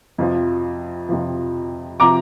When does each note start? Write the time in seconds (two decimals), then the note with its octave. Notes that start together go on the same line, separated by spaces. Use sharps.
0.18 F2 C3 F3
1.09 F2 C3 F3
2.00 C3 F3 A#5 D6